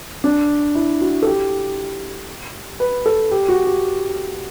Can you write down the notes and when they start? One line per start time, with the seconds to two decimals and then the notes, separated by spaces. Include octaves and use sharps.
0.24 D4
0.75 E4
1.01 F#4
1.22 A4
1.27 G4
2.80 B4
3.06 A4
3.31 G4
3.49 F#4
3.66 G4